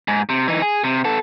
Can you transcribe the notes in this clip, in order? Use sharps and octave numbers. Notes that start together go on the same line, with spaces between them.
G#2
C3
E3 D#4
G#4
C3
B3 A4